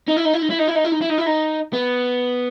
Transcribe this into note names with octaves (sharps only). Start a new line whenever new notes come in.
D#4
E4
D#4
E4
D#4
E4
D#4
E4
D#4
E4
D#4
E4
D#4
E4
D#4
B3